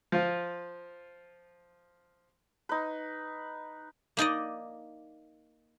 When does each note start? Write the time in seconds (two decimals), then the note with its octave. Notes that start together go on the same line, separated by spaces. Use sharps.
0.12 F3 F4
2.69 D#4 B4
4.17 A#3 D#4 D5 D#5